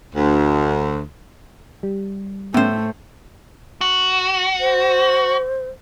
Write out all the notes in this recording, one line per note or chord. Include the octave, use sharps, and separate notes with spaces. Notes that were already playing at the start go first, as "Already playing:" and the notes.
D2
G3
A2 A3 B3 C#4 C5
F#4
C5